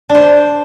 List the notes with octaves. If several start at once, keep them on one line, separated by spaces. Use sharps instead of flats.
D4
C5